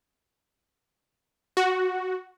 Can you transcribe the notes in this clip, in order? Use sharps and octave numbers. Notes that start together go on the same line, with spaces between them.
F#4